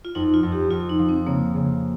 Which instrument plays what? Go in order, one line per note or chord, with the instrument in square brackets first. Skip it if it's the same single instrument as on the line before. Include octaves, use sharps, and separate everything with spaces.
[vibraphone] F4
[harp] F2 [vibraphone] D#4
[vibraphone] F4
[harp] F2
[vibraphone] G4
[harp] F2 [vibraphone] F4
[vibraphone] D#4
[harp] F3
[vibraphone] C4
[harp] C#3 [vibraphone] A#3
[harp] C#3